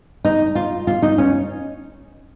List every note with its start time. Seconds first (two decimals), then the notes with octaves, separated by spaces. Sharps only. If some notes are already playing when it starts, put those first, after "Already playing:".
0.25 D#4
0.55 F4
0.87 F4
1.02 D#4
1.18 C#4